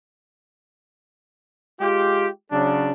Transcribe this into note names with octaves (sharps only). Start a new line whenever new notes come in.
G#3 F4 G4
C#3 F#3 D4